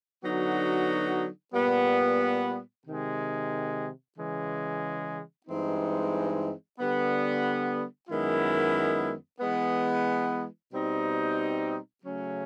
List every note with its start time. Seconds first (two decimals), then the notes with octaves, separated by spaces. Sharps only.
0.22 D3 F#3 B3 D#4 F#4
1.54 A#2 G3 B3
2.85 C3 D#3 G#3
4.16 C#3 E3 G#3
5.46 G2 E3 G#3 C4 D#4
6.79 D3 G3 B3
8.09 F#2 D#3 G#3 B3 E4
9.40 E3 G#3 B3
10.71 B2 G3 C4 D#4
12.02 C#3 F#3 A3 C#4